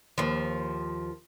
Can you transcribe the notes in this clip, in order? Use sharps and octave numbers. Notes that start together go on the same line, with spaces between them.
D#2 F3